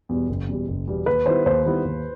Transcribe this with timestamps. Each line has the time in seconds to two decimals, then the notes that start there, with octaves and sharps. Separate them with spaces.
0.09 E2 B2 G3
0.29 F#1
0.48 E2 B2 G3
0.68 F#1
0.87 E2 B2 G3
1.06 D#2 B4
1.26 D#3 G3 B3 E4 C5
1.46 D#2 C5
1.66 D#3 G3 B3 E4
1.85 D#2